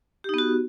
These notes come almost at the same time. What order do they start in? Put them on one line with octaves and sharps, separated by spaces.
G4 D#4 B3 F#4